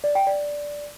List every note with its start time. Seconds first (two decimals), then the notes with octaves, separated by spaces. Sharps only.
0.04 D5
0.15 G5
0.27 D5